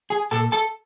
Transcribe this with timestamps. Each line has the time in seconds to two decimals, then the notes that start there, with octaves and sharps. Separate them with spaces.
0.10 G#4 G#5
0.31 A#2 A4 A5
0.52 A4 A5